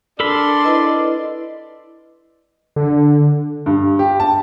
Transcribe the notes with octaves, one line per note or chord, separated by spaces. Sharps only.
D4 A4 A#4 D5 B5 C6
E4 B4 D#5
D3
G2
G4
A5